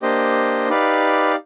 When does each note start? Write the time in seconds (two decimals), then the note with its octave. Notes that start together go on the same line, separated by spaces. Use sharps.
0.02 A#3 D4 G4 C5 D#5
0.69 D#4 G4 B4 D5 F5